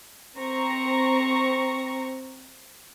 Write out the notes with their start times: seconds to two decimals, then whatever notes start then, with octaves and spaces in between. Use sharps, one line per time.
0.39 C4 A#5 C#6 A#6